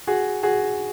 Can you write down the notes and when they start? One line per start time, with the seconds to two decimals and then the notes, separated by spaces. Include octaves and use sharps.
0.07 F#4 G#4
0.43 F#4 G#4